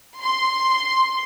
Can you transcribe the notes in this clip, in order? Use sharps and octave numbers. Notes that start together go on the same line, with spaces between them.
C6